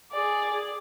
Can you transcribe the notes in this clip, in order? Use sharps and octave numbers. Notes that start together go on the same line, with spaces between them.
G#4 D5